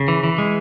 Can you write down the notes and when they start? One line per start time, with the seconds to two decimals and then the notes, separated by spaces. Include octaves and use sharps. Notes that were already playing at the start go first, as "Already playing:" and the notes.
Already playing: C#3
0.08 E3
0.24 E3
0.38 G#3